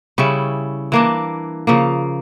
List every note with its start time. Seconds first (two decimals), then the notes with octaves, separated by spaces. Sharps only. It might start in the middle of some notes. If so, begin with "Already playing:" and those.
0.18 C#3 G3 C#4 E4
0.92 E3 A#3 D4
1.67 C#3 F3 A#3